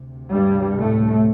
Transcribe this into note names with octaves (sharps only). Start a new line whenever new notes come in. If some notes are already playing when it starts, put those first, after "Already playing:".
Already playing: D2 C3
G2 G3
A2 A3